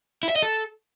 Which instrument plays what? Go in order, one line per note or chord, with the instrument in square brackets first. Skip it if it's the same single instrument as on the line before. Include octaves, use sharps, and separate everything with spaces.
[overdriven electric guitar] E4
E5
D#5
A4